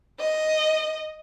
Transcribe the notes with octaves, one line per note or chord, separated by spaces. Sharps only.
D#5